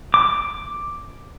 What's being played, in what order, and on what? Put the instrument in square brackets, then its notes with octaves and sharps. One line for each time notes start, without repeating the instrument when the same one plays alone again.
[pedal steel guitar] D6